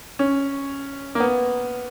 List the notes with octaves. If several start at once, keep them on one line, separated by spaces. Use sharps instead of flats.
C#4
A#3
B3